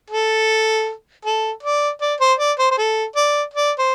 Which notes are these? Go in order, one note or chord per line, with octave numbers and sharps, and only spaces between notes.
A4
A4
D5
D5
C5
D5
C5
C5
A4
D5
D5
C5